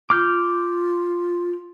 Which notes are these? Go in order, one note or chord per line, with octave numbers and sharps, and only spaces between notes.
F4 D6 F6 G6